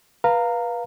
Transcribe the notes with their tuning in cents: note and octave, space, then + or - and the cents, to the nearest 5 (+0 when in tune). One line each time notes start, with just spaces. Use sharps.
B4 -30 F5 +0 A#5 -15